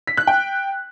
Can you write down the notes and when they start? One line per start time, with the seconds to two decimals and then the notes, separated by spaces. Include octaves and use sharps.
0.07 B6
0.17 F#6
0.27 G5